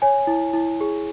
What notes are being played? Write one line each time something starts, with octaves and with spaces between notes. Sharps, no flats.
C#5 G#5
E4
E4
G#4